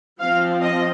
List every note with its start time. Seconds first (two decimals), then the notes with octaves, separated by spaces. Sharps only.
0.20 F3 C4 F5
0.62 D#5